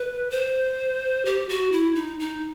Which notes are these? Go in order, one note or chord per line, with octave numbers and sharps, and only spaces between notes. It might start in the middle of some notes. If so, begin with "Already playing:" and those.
Already playing: B4
C5
G4
F#4
E4
D#4
D#4